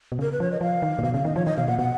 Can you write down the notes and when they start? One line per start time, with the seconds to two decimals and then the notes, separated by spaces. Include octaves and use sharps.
0.12 B2
0.19 C#3 A#4
0.32 B4
0.40 F3 C#5
0.52 D#5
0.61 F3 F5
0.82 D#3
0.99 A#2
1.03 B2 F5
1.14 C#3 F5
1.25 D#3 D#5
1.36 F3 C#5
1.46 D#3 D#5
1.57 B2 F5
1.67 A#2 F#5
1.79 B2 F#5